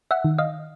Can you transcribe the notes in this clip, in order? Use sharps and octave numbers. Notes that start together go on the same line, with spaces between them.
E5 F#5
D#3
D#5 F5